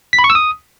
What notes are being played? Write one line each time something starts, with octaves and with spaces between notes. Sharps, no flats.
B6
B5
C#6
E6
D#6